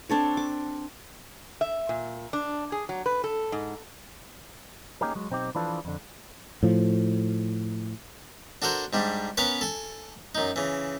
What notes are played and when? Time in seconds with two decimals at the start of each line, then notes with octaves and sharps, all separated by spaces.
0.09 C4 D4 A4 C#5
0.37 D6
1.61 E5
1.89 A#2
2.33 D4
2.72 G#4
2.89 F#3
3.06 B4
3.24 A4
3.52 G#2
5.01 A#3 C#4 D#4 G4 G#4 A#4
5.15 F#3 G#3
5.30 B1 C4 D#4 G4
5.55 E3 F3 D4 F4 A4 B4
5.85 F2 D3
6.63 A2 F3
8.62 D4 F#4 A4 A#4 C5
8.93 G#2 G3 D4
9.37 B3 C#4 A#4 B4 C#5
9.61 A4 G#5
10.35 F#2 D#4
10.56 C#3 E3